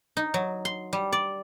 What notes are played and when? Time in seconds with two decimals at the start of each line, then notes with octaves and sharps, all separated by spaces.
0.17 D#4
0.34 F#3
0.65 C6
0.93 G3
1.13 D5